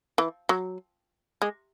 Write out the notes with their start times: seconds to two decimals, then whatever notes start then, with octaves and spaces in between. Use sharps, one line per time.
0.18 E3
0.49 F#3
1.42 G#3